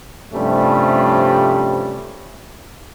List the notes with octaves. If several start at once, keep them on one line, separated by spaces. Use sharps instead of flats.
G2 C3 F3 G3 A3 C#4